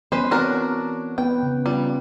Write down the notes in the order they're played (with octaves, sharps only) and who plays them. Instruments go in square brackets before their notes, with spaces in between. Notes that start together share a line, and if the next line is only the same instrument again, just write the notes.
[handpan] E3 B3 [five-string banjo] C#4 B4 C5
[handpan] C4 C#5 [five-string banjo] D4 F#4 A#4
[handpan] B3 B4 [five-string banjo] G5
[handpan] C#3
[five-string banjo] G3 [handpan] F4